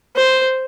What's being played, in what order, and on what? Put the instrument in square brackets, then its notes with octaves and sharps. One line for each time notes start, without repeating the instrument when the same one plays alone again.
[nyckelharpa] C5